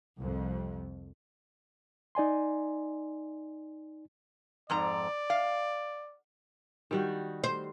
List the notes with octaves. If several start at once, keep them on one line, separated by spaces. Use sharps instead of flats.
C2 F2
D#4 D5 G#5 C6
F2 G#2 D5 A#5
F5
D#3 G3 F#4
C5